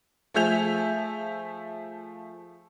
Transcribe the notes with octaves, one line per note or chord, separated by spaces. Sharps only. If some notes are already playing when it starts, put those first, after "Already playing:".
F3 A3 G#4 E5 G6 F7